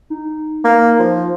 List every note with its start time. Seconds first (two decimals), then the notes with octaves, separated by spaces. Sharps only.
0.10 D#4
0.64 A#3
0.99 F3